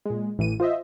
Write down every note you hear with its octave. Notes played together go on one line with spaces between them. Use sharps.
A#2 G#3
A1 E3 D#7
F4 C5 D#5 E5